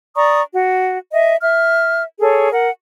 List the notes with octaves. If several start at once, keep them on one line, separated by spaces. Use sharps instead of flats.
D5 A#5 C#6 D#6
F#4
D#5 E5
E5 F6
G#4 A4 C#5
A#4 F#5